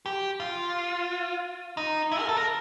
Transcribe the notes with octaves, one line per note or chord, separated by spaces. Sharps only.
G4
F4
D#4
E4
A#4
A4
A#4